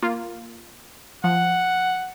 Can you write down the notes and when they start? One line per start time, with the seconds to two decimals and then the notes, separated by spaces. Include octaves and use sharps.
0.02 A#3 F4
1.24 F3 F#5